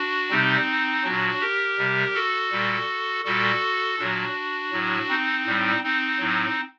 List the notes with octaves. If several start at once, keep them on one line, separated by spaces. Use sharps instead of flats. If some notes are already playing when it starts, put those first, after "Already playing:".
Already playing: D4 F#4
C3 G3 C4 D#4
A#2 F#3 D4 F#4
G4 A#4
C3 G3
F#4 A4
A#2 G3
A#2 G3 F#4 A4
A#2 F#3 D4 F#4
A2 F#3
C4 D#4
A2 G3
C4 D#4
A2 F#3